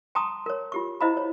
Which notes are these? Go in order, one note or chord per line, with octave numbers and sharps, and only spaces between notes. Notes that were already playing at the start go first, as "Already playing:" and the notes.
G5 A5 A#5 C6 C#6 D#6
A#4 C#5
F4 G4 C#6
E4 C5 D#5 F5 A#5 B5
C#5